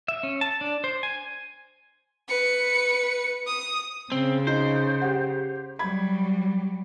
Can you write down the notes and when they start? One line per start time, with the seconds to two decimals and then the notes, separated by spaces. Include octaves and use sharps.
0.08 E5
0.23 C#4
0.41 A5
0.61 D4
0.84 C5
1.03 G#5
2.28 B4 C#7
3.46 D#6
4.12 C#3 C4
4.47 D#4 C5
5.02 G4 F#5
5.79 F#3 G3 B5 G#6